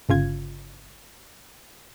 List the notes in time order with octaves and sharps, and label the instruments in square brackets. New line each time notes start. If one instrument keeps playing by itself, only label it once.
[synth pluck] G1 C#3 F4 G#6